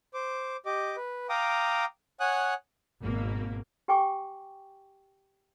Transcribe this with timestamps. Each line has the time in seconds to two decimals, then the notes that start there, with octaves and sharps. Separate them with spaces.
0.14 C5 D6
0.66 G4 D#5 D6
0.96 B4
1.29 F5 G5 A#5 D6 D#6
2.20 C#5 F#5 G#5 D#6 F#6
3.02 G#1 B2 A#3
3.88 G4 G5 G#5 C#6 D6